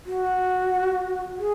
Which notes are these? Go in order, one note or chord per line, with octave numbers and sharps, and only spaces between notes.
F#4
G#4